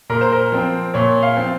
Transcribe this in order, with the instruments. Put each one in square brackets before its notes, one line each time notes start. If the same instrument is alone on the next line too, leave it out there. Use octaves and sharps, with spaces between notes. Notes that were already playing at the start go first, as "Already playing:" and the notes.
[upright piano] A#2 [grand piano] A#4
[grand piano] C5
A#4
[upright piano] F3 C4
[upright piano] A#2 [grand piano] C#5
[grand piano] F5
[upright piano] F3 C4